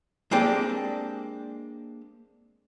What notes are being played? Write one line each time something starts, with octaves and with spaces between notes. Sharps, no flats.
G#3 A#3 C4 D4 G4 A4